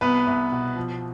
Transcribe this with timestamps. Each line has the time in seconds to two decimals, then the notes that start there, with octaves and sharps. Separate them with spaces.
0.01 C2 B3 B4
0.27 C2
0.52 B2
0.76 F3